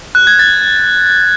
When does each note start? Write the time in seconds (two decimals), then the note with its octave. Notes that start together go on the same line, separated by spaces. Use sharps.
0.15 F#6
0.27 G#6
0.39 A6